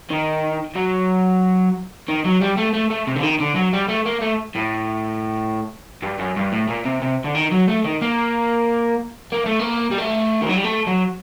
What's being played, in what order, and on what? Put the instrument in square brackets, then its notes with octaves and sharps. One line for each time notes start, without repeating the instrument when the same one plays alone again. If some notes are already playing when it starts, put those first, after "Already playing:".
[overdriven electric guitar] D#3
F#3
D#3
F#3
G3
A3
A3
A3
C3
D3
D#3
D3
F#3
G3
A3
A#3
A3
A2
G2
F#2
G2
A2
A#2
C3
C3
D3
D#3
F#3
A3
D#3
A#3
A#3
A3
A#3
G3
A3
D#3
F#3
G3
A3
F#3